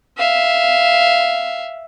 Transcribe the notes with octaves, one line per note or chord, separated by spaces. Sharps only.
E5 F5